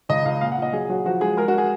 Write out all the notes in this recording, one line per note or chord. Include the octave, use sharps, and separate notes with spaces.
C#2 D#5
C#2 F5
A#2 F5
F#5
A#2 D#5
F#3 G#4
F#3 F#4
F3 F#4
G#3 G#4
G#3 A#4
F#4
G#4